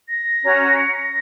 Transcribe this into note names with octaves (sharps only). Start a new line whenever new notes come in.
A#6
C#4 F#4 C#5 A#5
C#7
A#6